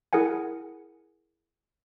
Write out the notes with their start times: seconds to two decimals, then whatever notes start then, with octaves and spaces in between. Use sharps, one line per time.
0.13 E4 G#4 A#4 F#5 G#5